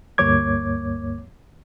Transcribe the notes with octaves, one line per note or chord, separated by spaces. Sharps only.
D2 G2 A#3 C#5 D6 G#6